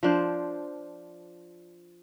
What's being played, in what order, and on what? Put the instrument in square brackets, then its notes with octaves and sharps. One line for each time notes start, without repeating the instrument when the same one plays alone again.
[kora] F3 D4 C5